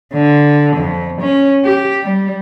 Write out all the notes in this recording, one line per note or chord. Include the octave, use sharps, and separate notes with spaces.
D3
F2
C#4
G4
G3